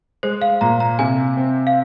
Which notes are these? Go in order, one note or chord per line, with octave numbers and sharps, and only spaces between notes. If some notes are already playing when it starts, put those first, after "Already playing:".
G#3 C5
F5
A#2 A#5
A#5
C3 G#5
C4
F5